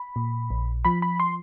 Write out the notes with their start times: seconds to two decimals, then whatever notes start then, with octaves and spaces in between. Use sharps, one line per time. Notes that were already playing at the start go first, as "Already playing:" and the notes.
Already playing: B5
0.16 A#2
0.51 A#1
0.85 F3 B5
1.02 B5
1.20 C6